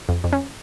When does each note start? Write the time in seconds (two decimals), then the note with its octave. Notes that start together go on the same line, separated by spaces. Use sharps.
0.09 F2
0.24 F2
0.33 C#4